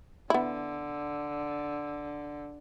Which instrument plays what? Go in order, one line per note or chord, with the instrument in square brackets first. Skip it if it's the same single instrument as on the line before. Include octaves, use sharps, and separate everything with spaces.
[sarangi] D3 [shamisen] B3 E4